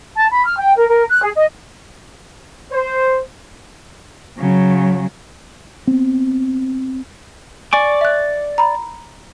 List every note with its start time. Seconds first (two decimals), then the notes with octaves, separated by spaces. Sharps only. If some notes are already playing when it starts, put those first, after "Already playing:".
0.16 A5
0.31 B5
0.46 F6
0.58 G5
0.77 A#4
0.89 A#4
1.09 F#6
1.22 G#4
1.34 D#5
2.72 C5
4.38 C#3 F#3
5.87 B3 C4
7.73 D5 G#5 C#6 D6
8.01 E5 F#6
8.58 A#5 B5